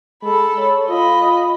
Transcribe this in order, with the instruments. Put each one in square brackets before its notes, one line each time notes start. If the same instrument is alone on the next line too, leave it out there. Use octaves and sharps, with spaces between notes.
[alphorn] G#3 [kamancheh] A4 B5
[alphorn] C#5
[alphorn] F4 [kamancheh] D#5 B5